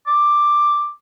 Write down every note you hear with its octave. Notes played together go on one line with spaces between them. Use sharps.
D6